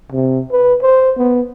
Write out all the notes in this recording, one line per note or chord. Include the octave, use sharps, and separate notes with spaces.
C3
B4
C5
B3